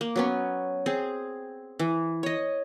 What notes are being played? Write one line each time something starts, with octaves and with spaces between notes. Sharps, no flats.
A#3
F#3 B3 C#4
C4 G#4
E3
C#5 D#5